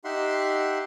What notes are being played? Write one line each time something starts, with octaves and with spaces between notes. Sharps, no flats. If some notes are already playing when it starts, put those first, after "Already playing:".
D#4 G4 E5 F#5 C6